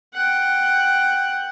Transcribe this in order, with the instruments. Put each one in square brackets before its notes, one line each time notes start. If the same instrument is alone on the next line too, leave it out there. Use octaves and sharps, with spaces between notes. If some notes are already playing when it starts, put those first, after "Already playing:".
[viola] F#5 G5